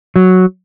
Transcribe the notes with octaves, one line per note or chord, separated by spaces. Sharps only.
F#3